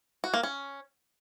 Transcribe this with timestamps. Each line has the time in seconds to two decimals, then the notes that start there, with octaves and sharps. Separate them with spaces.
0.24 F#4
0.34 A#3
0.43 C#4